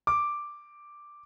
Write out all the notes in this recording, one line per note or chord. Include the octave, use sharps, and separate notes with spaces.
D6